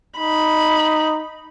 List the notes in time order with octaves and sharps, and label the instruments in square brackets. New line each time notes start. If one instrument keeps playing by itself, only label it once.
[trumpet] D#4 [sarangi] B5